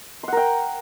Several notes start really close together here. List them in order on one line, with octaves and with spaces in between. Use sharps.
C6 F#5 A#4 G5